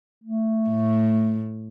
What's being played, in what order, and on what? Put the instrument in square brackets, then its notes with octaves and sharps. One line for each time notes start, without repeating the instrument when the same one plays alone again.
[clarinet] A3
[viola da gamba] A2